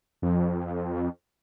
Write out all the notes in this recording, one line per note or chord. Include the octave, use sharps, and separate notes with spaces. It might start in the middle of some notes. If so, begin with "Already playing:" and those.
F2